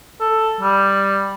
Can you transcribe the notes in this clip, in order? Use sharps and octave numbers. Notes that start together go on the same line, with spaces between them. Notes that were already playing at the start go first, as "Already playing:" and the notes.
A4
G3